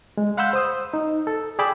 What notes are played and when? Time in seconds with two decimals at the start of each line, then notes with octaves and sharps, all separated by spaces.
0.17 G#3
0.37 F5 F#5 B5 C6 E6 G6
0.53 C5 D#6 E6
0.94 D#4
1.27 A4
1.59 G#4 D5 G5 B5 D6 E6